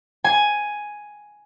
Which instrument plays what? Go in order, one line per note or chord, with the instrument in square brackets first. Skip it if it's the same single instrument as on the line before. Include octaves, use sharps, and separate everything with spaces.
[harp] G#5